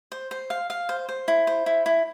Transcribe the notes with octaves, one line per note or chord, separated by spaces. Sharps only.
C5
C5
F5
F5
C5
C5
E4
C5
E4
E4